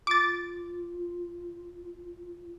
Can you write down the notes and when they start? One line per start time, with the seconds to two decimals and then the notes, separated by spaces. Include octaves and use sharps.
0.07 F4 D6 A6